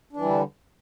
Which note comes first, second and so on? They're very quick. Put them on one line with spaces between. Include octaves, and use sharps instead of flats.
D4 E3 G3 D3